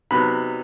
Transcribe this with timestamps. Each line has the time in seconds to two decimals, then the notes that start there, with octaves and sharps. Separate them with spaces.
0.11 C3 F#3 B3 D#4 B5